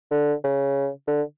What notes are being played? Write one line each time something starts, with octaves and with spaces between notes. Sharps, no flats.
D3
C#3
D3